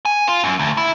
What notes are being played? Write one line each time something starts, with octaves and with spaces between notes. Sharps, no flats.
G#5
F4
F#2
D2
E4